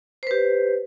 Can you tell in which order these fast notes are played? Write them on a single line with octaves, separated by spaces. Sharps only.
C5 B4 G4